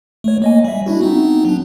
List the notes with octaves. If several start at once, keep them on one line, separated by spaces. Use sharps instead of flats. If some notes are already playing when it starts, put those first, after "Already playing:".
A3 C#5
A#3 D#5 G#5
G3 E5
D4 E4 F#4
B3 C4 D#4
F#3 D4